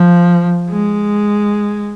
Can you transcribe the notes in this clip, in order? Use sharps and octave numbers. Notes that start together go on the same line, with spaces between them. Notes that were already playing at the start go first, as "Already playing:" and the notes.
Already playing: F3
G#3